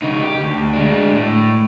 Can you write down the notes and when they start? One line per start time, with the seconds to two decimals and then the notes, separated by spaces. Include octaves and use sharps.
0.02 C#3 D#4
0.23 G4
0.41 D2
0.73 G#3 D4
1.13 A2